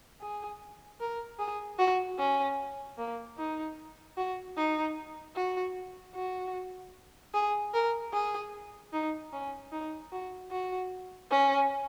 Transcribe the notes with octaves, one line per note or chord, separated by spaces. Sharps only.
G#4
A#4
G#4
F#4
C#4
A#3
D#4
F#4
D#4
F#4
F#4
G#4
A#4
G#4
D#4
C#4
D#4
F#4
F#4
C#4